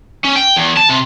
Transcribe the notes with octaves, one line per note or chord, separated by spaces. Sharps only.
C#4
G5
E2
A5
C3